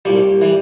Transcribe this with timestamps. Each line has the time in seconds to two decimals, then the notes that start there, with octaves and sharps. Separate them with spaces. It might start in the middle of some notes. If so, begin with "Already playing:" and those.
0.05 C2 A#2 G3 G4
0.41 E3 G3